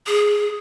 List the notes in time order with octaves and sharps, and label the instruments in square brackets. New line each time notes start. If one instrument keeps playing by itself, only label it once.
[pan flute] G#4